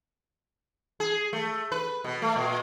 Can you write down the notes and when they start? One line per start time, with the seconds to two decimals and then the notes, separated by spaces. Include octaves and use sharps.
1.00 G#4
1.33 A3
1.72 B4
2.04 B2
2.22 A3
2.36 A#2